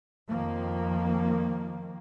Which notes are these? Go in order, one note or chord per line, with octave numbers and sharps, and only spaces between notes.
F2 D#3 F3 A#3